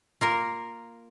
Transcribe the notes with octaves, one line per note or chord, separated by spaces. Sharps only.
A#3 F4 A#4